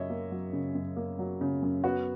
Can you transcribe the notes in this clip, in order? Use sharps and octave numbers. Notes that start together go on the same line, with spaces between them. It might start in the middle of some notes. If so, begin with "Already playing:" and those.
Already playing: F#2 C#3 C#5 D#5 E5
A#3
F#3
C#3
F#2
A#3
F#3
C#3
F#2
B3 F#4